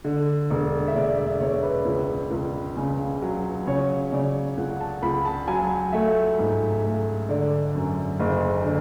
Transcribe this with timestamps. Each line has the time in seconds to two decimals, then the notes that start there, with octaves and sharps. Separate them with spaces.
0.04 D3
0.50 E1
0.88 E5
0.95 E1 D5
1.18 E5
1.40 E1 C#5
1.63 B4
1.85 C#2
2.31 C#2
2.77 C#3
3.22 F#3
3.67 C#3 C#5
4.12 C#3 D5
4.58 C#2 F#5
4.81 A5
5.02 C#2 B5
5.25 A5
5.48 F#3 G#5
5.93 A3 E5
6.39 G#2
6.83 A3
7.29 D3 D5
7.75 F#2
8.20 F#1
8.64 D3